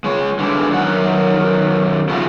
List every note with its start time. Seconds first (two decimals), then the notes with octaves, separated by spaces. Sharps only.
0.04 G#3 C#5
0.39 D3 E3 G#3 D4 E4
0.70 F#2 D#3 F#5
2.09 C#3 F3 A3 E4 F#4